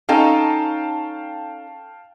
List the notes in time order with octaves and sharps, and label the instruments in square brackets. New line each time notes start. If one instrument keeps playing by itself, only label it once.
[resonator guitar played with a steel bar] C#4 D#4 A4 [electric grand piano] F5 G5 A5